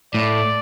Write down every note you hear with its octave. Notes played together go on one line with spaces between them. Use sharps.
A2 D5